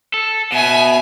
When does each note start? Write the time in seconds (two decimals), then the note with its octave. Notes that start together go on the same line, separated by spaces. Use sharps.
0.14 A4
0.52 B2 E5 G#5